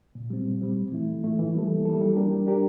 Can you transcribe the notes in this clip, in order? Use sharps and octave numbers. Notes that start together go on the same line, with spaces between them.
A#2
G3 C4
A#2
G3 C4
A2
E3 A3 E4
A2
E3 A3 E4
E3
G3 A#3 E4 A4
E3
G3 A#3 E4 A4
G3
D4 G4 A#4
G3
D4 G4 A#4